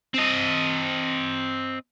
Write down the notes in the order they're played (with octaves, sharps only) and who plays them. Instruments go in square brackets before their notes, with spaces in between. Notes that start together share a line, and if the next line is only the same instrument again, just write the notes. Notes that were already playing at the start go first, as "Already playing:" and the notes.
[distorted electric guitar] C4 D#5